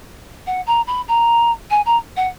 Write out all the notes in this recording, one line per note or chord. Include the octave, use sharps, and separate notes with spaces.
F#5
A#5
B5
A#5
G#5
A#5
F#5